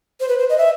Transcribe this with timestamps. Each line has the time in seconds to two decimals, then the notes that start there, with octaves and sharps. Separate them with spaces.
0.20 C5
0.28 B4
0.38 C5
0.50 D#5
0.58 E5